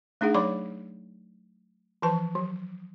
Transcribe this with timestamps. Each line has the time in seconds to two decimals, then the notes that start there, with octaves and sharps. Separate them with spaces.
0.21 A3 D4 D#4 G#4 F#5
0.34 F#3 C#5 D5 B5 D6
2.02 E3 F3 B4 A5
2.35 F#3